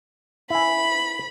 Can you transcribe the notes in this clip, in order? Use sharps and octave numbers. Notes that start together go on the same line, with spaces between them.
E4 G#5 B5